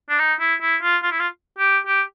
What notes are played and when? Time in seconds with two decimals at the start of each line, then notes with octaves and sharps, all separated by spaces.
0.10 D4
0.19 D#4
0.40 E4
0.62 E4
0.82 F4
1.03 F4
1.12 E4
1.20 F4
1.58 G4
1.87 G4